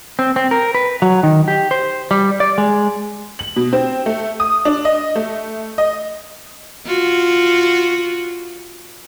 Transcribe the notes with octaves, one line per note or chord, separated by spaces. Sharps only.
C4
C4
A#4
B4
F#3
D#3
G4
C5
G3
D5
G#3
F#7
B2
C4
A3
D#6
D4
D#5
A3
D#5
F4 F#4